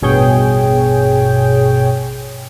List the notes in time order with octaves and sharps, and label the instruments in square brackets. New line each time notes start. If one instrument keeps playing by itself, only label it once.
[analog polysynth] A1 G2 B2 G#4 C#5 G5